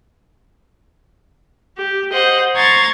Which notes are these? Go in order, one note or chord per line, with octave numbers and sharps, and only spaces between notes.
G4
C5 D#5 F#5
A#5 C6 C#6 G#6 A6